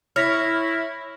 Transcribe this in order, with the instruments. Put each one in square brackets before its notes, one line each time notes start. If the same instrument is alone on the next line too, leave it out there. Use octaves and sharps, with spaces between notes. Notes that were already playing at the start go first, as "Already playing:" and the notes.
[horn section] E4 [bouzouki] C#5 [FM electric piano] F6 A#6 B6